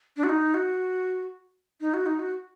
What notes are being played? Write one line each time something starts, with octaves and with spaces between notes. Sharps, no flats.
D4
F#4
D#4
F#4
D#4
F#4
D#4
F#4